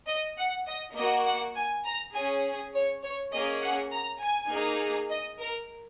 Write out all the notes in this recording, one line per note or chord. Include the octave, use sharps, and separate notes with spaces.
D#5
F#5
D#5
A#3 F#4 D#5
F#5
G#5
A#5
C#4 G#4 G#5
C#5
C#5
A#3 C#4 G#4 D#5
F#5
A#5
G#5
A#3 D#4 G#4
D#5
A#4